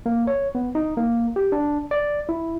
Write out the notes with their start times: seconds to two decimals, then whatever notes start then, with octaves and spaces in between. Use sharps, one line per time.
0.06 A#3
0.27 C#5
0.55 B3
0.75 D#4
0.97 A#3
1.36 G4
1.52 D4
1.91 D5
2.29 E4